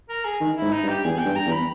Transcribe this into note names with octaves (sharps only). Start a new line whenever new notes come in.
A#4
G#4
D#3
E4
G#2
D#4
G2
G4
E2 G#4
G5
G2
A#5
E2
B5